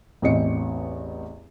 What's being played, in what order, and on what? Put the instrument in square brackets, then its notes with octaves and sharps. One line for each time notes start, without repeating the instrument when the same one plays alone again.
[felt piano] A1 E2 C4 D#5 C#7